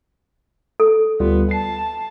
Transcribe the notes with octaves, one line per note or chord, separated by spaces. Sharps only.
A4
D2 G3 B3 F4
A5 C7